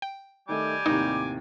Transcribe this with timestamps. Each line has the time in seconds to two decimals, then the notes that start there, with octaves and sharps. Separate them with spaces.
0.02 G5
0.49 D#3 G3 A3 G#5 D6
0.86 D#2 A2 C3 D#4